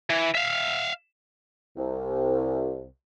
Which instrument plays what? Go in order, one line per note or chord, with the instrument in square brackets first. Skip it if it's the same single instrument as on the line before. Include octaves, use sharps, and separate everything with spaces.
[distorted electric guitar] E3
E5 F5
[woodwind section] C2